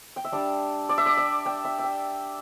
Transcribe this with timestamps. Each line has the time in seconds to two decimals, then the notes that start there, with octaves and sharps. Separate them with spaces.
0.16 G5
0.25 E5
0.32 G3 D4 D5
0.89 D5
0.98 E5
1.06 D5
1.17 E5
1.46 G5
1.64 E5
1.79 E5
1.84 G5